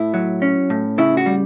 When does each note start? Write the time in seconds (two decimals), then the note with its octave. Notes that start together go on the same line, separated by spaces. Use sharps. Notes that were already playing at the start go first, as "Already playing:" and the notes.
Already playing: A2 E4
0.14 F#3
0.42 C#4
0.70 A2
0.98 C#3 E4
1.17 F#4
1.26 G3